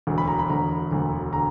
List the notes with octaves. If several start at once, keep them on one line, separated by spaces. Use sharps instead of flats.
E1 D2 D3
B5
A#5
B5
E1 D2 D3 A#5
E1 D2 D3
D3 A#5